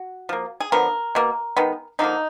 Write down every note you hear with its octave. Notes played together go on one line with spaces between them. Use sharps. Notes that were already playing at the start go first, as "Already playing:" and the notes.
Already playing: F#4
F3 A#3
G#4
D3 F3 B3 A#4
B2 A#3
D#3 G#3 B3
D3 F3 A#3 D#4